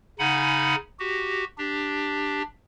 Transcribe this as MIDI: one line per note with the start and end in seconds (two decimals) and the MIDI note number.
0.19 0.75 49
0.19 0.75 63
0.19 0.75 78
0.19 0.75 80
0.19 0.75 83
0.99 1.44 66
0.99 1.44 67
1.58 2.42 62
1.58 2.42 67